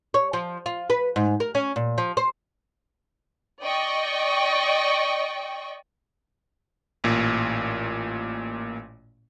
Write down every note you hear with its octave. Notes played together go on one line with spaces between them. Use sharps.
C#5
F3
F4
B4
G#2
A#4
C#4
A#2
F3
C5
D5 D#5 G5 C#6
A1 A#2